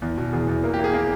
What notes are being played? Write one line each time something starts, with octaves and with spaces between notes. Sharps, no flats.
E2
B2
E2 G#4
E2
A#3 A#4
G4
A#3
G#4
A#3